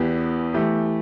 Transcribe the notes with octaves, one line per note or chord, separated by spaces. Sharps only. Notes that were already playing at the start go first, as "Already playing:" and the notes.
Already playing: E2 E3 B3 G4
E3 A3 G4